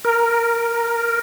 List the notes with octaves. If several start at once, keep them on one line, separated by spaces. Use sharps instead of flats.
A#4